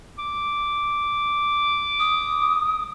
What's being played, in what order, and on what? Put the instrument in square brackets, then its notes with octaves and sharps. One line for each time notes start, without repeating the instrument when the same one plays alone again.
[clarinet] D6
[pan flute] D#6